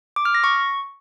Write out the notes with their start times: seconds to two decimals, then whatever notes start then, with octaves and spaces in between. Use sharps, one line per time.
0.16 D6
0.25 F6
0.35 A#6
0.44 C#6